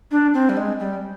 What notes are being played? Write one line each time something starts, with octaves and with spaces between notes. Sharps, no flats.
D4
C4
G3
G#3
G3